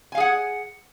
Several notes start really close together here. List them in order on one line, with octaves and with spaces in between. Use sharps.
G#5 F5 G#4 F#5